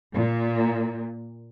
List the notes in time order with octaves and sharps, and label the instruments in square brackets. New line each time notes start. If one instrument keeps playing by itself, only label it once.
[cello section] A#2